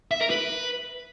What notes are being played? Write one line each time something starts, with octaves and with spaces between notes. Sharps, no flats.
E5
A#4
B4